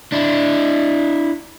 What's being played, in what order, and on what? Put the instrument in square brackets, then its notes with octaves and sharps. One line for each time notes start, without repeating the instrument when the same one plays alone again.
[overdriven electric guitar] D4 E4